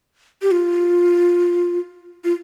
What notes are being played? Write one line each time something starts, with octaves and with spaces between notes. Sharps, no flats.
G4
F4
F4